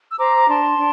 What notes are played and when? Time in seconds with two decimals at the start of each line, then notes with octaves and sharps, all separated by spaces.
0.10 E6
0.18 C5 A#5 D6
0.37 D6
0.48 D4 A5 C6
0.77 D4